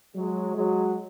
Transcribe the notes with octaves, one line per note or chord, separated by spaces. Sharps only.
F#3 G#3
F#3 G#3